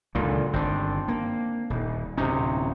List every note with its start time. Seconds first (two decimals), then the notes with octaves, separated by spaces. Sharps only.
0.15 C#2 F#2 A#2 D3 D#3
0.53 G1 D#3 C4 D4
1.08 A#3
1.70 D#1
2.18 D1 C3 C#4 D#4